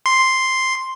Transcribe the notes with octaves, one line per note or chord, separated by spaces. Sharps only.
C6